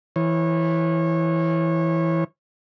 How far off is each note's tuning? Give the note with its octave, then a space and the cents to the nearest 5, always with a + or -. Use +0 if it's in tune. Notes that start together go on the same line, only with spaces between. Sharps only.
E3 +0 C#5 -30